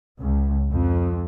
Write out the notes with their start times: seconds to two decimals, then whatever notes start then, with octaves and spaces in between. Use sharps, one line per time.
0.19 C#2
0.71 F2